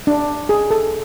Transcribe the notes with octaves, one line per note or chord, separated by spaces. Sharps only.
D4
G#4
A4